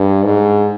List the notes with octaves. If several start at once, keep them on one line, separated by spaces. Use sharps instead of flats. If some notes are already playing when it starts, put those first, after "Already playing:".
Already playing: G2
G#2